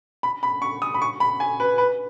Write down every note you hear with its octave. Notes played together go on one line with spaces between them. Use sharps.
B5
B5
C#6
D#6
B5
C#6
B5
G#5
B4
B4